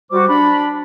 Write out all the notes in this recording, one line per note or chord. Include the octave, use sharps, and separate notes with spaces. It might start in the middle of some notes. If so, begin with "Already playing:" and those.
G3 F#4 C5 D6
D4 B5